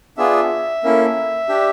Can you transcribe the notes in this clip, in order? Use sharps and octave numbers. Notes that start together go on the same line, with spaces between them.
B3 D4 F4 G#4 E5
A#3 C#4 E4 A4
D4 G4